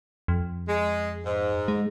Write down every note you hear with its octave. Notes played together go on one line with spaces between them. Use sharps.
F2
G#3
G#2
G#3